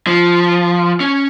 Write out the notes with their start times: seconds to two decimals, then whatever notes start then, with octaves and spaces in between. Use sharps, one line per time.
0.07 F3
1.00 C#4